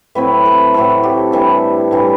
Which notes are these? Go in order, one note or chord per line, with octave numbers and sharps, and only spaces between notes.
A2 F#3 C4 E4 B4
A4
A2 F#3 C4 E4 A4
G4
A2 E3 G3 D4 E5
A2 E3 G3 D4